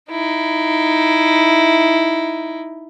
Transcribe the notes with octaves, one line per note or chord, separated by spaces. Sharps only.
D#4 E4